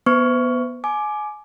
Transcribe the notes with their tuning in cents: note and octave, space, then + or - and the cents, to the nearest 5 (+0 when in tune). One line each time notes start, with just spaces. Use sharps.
B3 -15 C5 -45 C#6 +15
G#5 +25 D6 +10